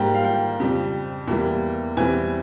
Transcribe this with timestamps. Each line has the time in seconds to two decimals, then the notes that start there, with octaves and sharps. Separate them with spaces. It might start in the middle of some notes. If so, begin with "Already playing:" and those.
Already playing: G#2 G3 A#3 G5
0.14 F5
0.25 G5
0.60 F2 C#3 G3 C4
1.28 E2 E3 G3 A#3
1.97 E2 E3 G3 C4 G#5